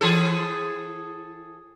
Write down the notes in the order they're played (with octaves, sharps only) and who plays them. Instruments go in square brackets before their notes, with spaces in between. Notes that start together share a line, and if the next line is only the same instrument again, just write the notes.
[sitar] E3 G#4 A4